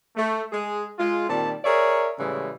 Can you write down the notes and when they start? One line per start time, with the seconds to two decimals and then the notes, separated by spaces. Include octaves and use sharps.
0.15 A3
0.53 G#3 G#4
0.99 G#3 F4
1.28 A#2 D#3 G3 C4 A5
1.65 G#4 A#4 C#5 D5 E5
2.19 A2 C#3 E3 G3 G#3